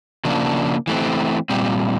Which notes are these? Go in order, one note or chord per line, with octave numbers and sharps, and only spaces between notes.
C#3 F3 A#3 D4
E3 A3 C4
A#2 G3 C4